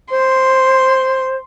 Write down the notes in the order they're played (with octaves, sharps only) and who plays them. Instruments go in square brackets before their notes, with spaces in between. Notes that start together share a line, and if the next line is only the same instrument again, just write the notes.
[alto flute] C5 [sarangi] C6